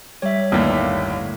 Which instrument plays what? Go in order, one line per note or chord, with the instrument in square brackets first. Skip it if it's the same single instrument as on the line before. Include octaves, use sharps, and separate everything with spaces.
[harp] G3 [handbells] C#5 E5
[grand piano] G1 D#2 [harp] A2 D3 A#3